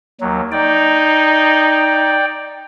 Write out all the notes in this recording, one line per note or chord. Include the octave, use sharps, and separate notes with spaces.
D#2 F#3
D#4 D5 G5